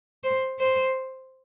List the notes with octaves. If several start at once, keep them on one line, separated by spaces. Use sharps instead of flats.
C5
C5